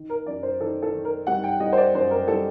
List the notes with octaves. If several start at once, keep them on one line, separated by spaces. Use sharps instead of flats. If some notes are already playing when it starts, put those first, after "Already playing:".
Already playing: D#3
A#4
F#2 D5
C5
D#3 A4
A4
D#3
A#4
G3 F#5
G5
G3 D#5
C5
D5
F#2 C5
A#4
G3 A4